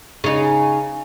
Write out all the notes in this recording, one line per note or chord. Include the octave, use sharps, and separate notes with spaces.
C#3 D#4